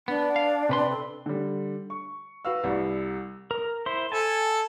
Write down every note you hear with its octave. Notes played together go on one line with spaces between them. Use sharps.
B3 D4
F5
C3 B4 C6
A4
D3 G3
C#6
F#4 B4 F5 E6
C2 G3
A#4
E4 C5 C6
A4 G#5 A5